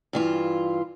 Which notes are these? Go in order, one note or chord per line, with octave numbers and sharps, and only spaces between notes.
G2 E3 F4